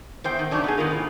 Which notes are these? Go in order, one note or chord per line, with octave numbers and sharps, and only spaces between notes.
E2 C5 G5
D#3
C#3 F#3 D4 D#4
B3 D#4 G#4
D#3 G#3 B3 F4 A#4 C5
A2